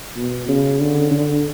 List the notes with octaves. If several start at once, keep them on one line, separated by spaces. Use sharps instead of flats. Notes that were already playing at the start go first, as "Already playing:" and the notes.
B2
C#3
D3
D3